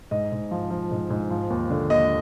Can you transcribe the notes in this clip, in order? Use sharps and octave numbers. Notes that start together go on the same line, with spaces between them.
G#2 D#5
G#2
F3
F3
G#2
G#2
F3
D#2
D3
D#2 D#5